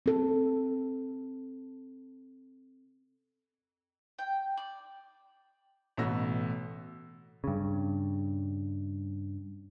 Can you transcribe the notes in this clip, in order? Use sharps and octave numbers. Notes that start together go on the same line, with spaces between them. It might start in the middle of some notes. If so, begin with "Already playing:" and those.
C4 A4
G5
D5
A1 B2 A3 E6 A#6
G2 C#3